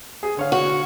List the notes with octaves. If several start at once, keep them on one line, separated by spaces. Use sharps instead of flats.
G#4
D3 C#5 F5
F#4